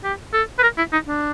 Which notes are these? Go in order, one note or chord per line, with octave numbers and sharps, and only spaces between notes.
G4
A4
B4
A#4
E4
D#4
D4